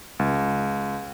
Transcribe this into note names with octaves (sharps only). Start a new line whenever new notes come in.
C#2